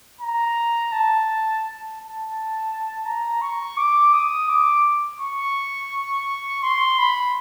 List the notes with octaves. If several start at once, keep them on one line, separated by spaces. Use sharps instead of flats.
A#5
A5
A5
A#5
C#6
D6
D#6
D6
C#6
C6
B5